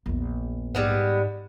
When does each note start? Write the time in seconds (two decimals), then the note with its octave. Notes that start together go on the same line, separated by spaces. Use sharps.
0.06 A#1 E2
0.75 G#2 G3 G#3 B3